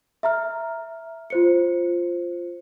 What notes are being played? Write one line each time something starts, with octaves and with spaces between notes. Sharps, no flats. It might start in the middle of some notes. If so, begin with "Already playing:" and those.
E5 A#5 F6
F4 C5 C#7